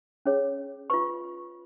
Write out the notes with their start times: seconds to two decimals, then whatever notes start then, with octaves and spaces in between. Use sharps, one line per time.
0.26 C#4 G#4 C#5
0.90 F4 B4 C#6